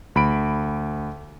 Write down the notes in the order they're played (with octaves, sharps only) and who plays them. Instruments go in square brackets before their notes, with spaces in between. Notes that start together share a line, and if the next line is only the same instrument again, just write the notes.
[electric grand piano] D2 B5 D7